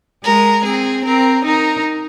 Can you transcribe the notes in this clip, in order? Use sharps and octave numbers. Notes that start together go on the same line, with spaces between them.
G#3 A#4
C4 G#4
C4 A#4
D#4 A#4